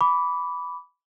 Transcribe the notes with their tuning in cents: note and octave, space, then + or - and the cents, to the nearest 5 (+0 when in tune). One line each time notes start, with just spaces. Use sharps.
B5 +0 D6 -20